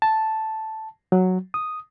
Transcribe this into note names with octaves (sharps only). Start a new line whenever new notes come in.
A5
F#3
D#6